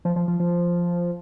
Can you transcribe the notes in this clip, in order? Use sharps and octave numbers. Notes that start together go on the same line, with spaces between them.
F3
F3
F3
F3